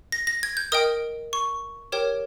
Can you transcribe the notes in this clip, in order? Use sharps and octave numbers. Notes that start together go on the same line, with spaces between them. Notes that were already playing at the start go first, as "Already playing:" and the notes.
A#6
A#6
G#6
G6
A#4 D#5 G5 D#6
C#6
G4 A#4 C#5 G5